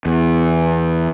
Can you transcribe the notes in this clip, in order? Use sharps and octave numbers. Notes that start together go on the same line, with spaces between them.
E2